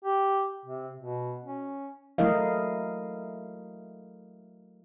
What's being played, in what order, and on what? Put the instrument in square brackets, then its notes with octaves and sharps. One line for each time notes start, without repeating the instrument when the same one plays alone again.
[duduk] G4
C3
B2
C#4
[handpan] F#3 A3 E4 A#4 D#5 F5